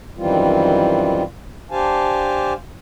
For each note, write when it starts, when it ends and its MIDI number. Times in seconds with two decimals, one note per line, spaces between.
0.17 1.23 42
0.17 1.23 51
0.17 1.23 52
0.17 1.23 55
0.17 1.23 60
0.17 1.23 65
1.71 2.53 62
1.71 2.53 67
1.71 2.53 72
1.71 2.53 77
1.71 2.53 80
1.71 2.53 81